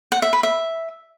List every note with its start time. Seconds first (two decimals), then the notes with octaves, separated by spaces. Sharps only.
0.12 F#5
0.22 E5
0.33 B4
0.43 E5